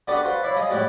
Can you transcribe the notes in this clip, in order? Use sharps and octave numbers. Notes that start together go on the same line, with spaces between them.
D3 B3 F#4 G4 A4 D5
F#4 A4 B4 C5 F5
E4 C#5 D5 E5 F5
F3 G#4 D#5 F5 D#6
F2 A2 E4 F#4 G4 D5